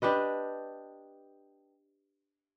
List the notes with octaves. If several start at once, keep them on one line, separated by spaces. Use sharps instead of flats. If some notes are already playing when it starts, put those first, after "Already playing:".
D4 G4 B4 D#5